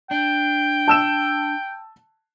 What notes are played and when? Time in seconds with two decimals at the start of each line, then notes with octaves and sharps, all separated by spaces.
0.11 D4 G5
0.88 A5 E6 E7